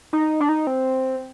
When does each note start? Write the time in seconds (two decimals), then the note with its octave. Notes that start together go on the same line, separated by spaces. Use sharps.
0.13 D#4
0.40 D4
0.49 D#4
0.67 C4